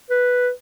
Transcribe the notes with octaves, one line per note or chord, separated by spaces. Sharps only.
B4